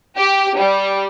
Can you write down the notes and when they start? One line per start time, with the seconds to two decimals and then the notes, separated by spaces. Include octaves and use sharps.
0.18 G4
0.57 G3